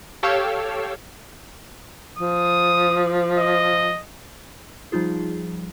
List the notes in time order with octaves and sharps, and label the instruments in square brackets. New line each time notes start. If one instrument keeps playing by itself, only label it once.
[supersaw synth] G4 A4 C#5 F5 G5 E6
[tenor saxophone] F3 [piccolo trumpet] D#6
[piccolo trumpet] D#5
[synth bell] F3 G3 D#4 F4 G#4